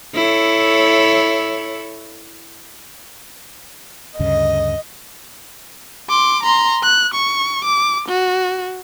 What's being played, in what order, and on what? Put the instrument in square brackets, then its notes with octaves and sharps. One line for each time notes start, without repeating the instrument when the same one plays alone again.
[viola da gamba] E4 A4 C#5
[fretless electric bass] D2 G2 C#3 [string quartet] D#5
[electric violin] C6 D6
A#5 C6
F#6
C#6
D6
F#4